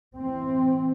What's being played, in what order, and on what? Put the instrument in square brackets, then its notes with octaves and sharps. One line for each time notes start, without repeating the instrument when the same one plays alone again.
[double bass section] E3 C4